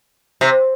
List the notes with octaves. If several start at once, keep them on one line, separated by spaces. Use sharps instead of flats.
C3